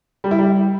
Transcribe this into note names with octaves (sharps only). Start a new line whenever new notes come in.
G3
E4
G3